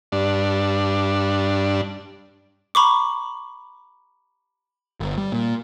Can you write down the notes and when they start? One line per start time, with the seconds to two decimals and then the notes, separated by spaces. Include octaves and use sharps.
0.12 G2 D4
2.75 A#5 B5 C#6 D6
5.00 G1
5.18 G3
5.32 A#2